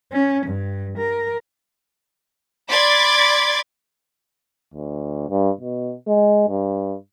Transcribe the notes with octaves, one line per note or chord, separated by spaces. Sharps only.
C#4
G2
A#4
D5 B5 C6 D6 G#6 A6
D2
G2
B2
G#3
G2